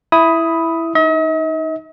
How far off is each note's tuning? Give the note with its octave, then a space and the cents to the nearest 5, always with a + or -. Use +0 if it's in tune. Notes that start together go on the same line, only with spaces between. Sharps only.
E4 +0 B5 +0 D#6 +10
D#4 +0 D#5 +45